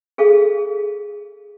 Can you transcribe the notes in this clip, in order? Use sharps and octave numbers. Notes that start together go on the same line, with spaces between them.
G#4 A4 F5